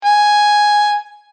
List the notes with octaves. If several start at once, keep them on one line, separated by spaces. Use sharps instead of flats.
G#5